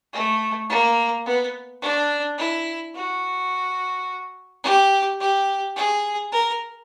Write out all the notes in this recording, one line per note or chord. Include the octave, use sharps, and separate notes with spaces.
A3
A#3
B3
D4
E4
F#4
G4
G4
G#4
A#4